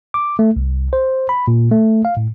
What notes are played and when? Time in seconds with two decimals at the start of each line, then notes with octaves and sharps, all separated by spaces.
0.14 D6
0.39 A3
0.56 C2
0.93 C5
1.29 B5
1.48 A#2
1.72 A3
2.05 F5
2.17 A2